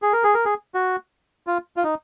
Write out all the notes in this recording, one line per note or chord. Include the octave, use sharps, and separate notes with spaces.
G#4
A#4
G#4
A#4
G#4
F#4
F4
F4
D#4